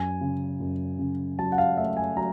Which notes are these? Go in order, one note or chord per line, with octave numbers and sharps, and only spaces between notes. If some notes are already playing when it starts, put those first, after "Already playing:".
Already playing: F#2 G#5
C#3
F#2
C#3
F#3 A5
F#5
F5
A3 E5
G#5
F#3 A#5